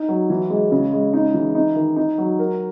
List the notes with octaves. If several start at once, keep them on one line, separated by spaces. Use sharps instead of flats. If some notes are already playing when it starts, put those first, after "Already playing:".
Already playing: D#4
F#3
E3
G#3
C#3
G#3
D#4
E3
D#4
D#3
D#4
F#3
A#4